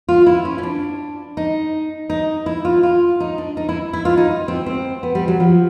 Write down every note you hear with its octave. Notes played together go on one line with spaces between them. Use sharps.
F4
E4
C#4
C#4
D4
D#4
D#4
E4
F4
F4
D#4
D4
D#4
E4
E4
F4
D#4
C4
C4
B3
G3
F#3
F3